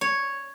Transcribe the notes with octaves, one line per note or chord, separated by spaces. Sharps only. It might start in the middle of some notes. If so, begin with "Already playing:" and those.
C#5